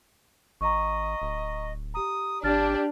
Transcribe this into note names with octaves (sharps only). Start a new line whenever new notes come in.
G#1 D#5 A#5 C#6
D1
G4 A#5 D#6
G#1 D4 G4 F6 A6